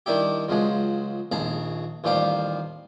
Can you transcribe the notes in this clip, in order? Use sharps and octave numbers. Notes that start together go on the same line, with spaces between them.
D#3 G3 D4 E4 G4
C#2 F3 F#3 G#3
A#1 D#2 G#4 A5 A#5
A1 D#2 F3 G3 G4 F5